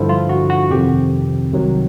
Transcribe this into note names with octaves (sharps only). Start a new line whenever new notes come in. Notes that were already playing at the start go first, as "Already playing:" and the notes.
Already playing: G2 D3 F3 E4
F4
F#4
F#4
F2 C3 D#3 G4
C2 C3 D#3 F#3